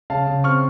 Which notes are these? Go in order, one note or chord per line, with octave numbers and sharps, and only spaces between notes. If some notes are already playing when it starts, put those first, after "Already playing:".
C#3 F5 A5
C#3
C4 C#6 F6